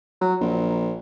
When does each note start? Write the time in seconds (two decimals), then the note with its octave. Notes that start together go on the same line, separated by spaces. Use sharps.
0.21 F#3
0.41 A#1